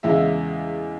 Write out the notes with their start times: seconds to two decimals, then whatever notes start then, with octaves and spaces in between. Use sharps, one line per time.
0.03 E2 C#3 G#3 E4 E5